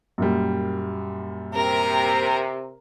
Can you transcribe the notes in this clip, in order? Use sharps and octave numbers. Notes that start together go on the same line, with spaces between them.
F#2 A#2 G3
C3 A#4